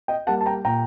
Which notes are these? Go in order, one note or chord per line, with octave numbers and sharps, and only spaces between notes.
D#5 G5
G3 A#3 F#5 A5
A5
G5 A#5
A#2 G5 A#5